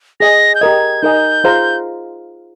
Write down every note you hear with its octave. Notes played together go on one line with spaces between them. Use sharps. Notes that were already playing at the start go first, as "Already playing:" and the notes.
G#4 D#5 G#5 A#6
G6
G4 A#4 D#5 G#6
D#4 A#4 D#5 G#5 G6
F4 G#4 C5 F5 A#5